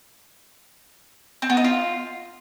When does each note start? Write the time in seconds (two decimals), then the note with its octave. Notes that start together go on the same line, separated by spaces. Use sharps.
1.42 C4
1.50 B3
1.57 D#4
1.64 F4